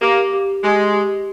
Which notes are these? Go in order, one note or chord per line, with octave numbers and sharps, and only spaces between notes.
A#3 G4
G4
G#3 G4
G4